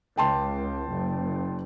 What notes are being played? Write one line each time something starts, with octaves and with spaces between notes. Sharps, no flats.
C#2 G5 A5 C6
F#1